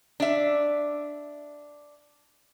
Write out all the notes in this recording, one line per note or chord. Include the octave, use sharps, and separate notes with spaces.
D4 E5